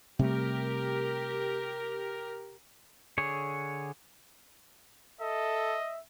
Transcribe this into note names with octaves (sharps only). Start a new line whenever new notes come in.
C3 G3 A3 G4 A#4
D3 G#4 C#5
A4 D#5 E5